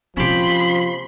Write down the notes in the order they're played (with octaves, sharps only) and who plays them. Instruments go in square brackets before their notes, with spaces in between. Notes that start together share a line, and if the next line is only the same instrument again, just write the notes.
[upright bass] C3 A#3 [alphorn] F3 [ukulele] C#4 G4 [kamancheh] B5 C6